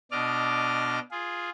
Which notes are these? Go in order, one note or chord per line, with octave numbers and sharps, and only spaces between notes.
B2 D4 D5 D#5 D6 F6
F4 G#4